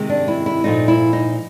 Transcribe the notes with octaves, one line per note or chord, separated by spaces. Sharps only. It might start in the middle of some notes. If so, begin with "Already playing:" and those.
Already playing: C3 D#3 G#3
D4
E4
E4
A#2 F3 A3 D#4
E4
D#4